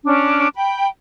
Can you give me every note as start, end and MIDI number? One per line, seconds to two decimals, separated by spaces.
0.05 0.47 61
0.05 0.47 62
0.56 0.87 79
0.56 0.87 83